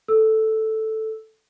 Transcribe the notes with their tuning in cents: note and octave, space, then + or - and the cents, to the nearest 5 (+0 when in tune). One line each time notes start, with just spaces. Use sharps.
A4 +0 E6 +0